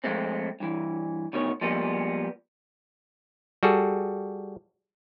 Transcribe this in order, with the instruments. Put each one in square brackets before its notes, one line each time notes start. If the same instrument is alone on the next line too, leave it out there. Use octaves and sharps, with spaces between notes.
[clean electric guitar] F2 G#3 A3 C4
G2 E3
D2 B2 D#3 C#5
F3 G3 G#3 A#3 B3
[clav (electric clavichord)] G3 F#4 G#4 A4